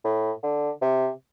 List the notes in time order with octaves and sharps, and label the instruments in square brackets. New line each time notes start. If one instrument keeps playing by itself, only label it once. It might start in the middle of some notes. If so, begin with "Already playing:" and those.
[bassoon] A2
D3
C3